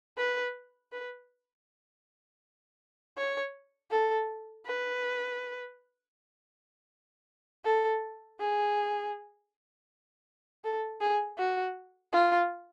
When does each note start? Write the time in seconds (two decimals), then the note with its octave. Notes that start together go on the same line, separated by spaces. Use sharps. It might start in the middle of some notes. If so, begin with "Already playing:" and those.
0.18 B4
0.92 B4
3.17 C#5
3.91 A4
4.66 B4
7.65 A4
8.40 G#4
10.64 A4
11.01 G#4
11.38 F#4
12.13 F4